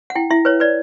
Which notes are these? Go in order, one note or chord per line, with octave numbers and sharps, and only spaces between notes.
F#5
E4 G5
E4 E5
B4 C#5
B4 D5